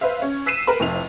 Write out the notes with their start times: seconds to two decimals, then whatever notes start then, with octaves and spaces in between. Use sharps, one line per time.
0.01 B4 C5 E5 F5
0.22 C#4
0.46 E6 B6 C7 D#7 E7
0.67 A#4 B4 B5
0.80 F1 F2 E4 F7